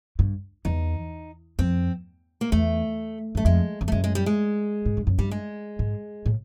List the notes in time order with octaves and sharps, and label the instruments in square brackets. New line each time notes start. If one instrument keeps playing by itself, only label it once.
[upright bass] G2
[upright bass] E2 [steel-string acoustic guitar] D#4
[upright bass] F2 [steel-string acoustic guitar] C4
[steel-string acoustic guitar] A#3
[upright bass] E2 [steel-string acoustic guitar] A3
[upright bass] F#2 [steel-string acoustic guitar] A3
[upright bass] F2 [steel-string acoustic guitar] G#3
[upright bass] F2
[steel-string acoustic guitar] A3
[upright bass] F#2 [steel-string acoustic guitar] G#3
[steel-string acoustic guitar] G#3
G3
G#3
[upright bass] G#2
G2
F#2
[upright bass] G2 [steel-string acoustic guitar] G3
[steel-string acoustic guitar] G#3
[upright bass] G#2
A2